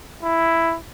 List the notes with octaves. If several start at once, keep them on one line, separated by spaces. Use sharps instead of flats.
E4